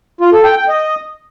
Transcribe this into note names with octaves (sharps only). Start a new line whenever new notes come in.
F4
A4
G5
G5
D#5